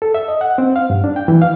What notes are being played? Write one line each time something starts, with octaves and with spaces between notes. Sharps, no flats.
A4
E5
D#5
F#5
C4
F5
G2
D4
G5
E3
F5